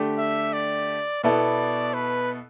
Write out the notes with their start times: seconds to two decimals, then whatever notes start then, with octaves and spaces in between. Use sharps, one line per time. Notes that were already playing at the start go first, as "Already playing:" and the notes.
Already playing: D3 A3 D4 G4
0.18 E5
0.53 D5
1.23 B2 B3 E4 A4 D5
1.94 B4